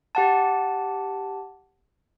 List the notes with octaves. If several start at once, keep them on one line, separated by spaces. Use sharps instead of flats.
G4 F#5 A5